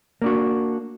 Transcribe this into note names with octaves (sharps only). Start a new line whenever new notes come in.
A#3 D4 F#4